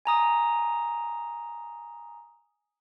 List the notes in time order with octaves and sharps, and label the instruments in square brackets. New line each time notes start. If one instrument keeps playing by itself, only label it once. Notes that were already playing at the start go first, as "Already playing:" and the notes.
[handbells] G#5 A#5 D#6